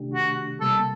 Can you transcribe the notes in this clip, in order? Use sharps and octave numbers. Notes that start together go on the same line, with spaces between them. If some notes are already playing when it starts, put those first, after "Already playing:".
Already playing: C3 D#3 A3 D4 G4
F#4
C3 G3 A#3 A4